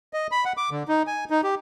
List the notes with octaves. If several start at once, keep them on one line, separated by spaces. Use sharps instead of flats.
D#5
B5
F#5
D6
D3
D#4
G#5
D#4
G4